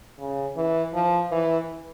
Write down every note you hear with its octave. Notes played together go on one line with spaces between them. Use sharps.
C#3
E3
F3
E3